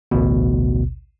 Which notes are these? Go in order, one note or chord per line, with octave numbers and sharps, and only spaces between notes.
A1 D2 B2